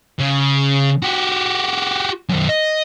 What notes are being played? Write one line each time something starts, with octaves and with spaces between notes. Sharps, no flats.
C#3
F#4 G4
F#2 D#3
D#5